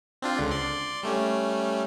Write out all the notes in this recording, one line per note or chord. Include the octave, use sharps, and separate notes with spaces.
C4 D4 F4
C#2 D3
D5 C6
G3 A3 C#4